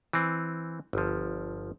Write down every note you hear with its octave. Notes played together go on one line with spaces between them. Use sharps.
E3 C4
G1 F3